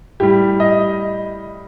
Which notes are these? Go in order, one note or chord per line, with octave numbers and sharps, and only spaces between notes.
A2 G3 G4
D#5